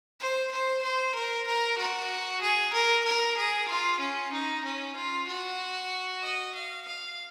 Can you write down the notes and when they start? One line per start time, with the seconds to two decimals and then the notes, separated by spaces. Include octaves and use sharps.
0.20 C5
0.51 C5
0.83 C5
1.15 A#4
1.47 A#4
1.78 F#4
2.42 G#4
2.73 A#4
3.05 A#4
3.37 G#4
3.69 F4
4.00 C#4
4.33 D#4
4.64 C#4
4.96 F4
5.27 F#4
6.22 D#5
6.55 F5
6.86 F5